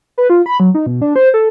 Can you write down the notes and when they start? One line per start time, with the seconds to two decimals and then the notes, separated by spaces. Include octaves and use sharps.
0.18 B4
0.30 F4
0.46 B5
0.60 F#3
0.75 D#4
0.86 B2
1.02 D4
1.16 C5
1.34 A4